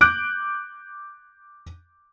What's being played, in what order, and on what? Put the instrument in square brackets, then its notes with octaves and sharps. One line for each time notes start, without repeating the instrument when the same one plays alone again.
[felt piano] D6 F#6 G6 D7